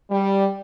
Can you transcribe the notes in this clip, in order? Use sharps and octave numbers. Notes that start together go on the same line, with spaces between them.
G3